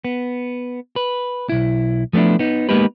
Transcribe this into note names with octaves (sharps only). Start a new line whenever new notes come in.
B3
B4
B1 E4
F3 A3 B3 D4 E4
B3 D#4
G#3 A#3 B3 D#4 G4 B4